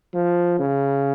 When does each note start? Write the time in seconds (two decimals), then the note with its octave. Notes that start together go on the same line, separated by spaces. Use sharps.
0.14 F3
0.59 C#3